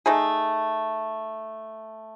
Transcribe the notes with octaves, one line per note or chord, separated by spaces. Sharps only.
A3 D#4 G#4